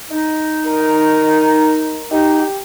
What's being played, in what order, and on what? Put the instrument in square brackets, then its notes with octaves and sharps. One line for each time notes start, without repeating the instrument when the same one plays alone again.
[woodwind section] D#4
[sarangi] A#4
[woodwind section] D#4 [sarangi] G4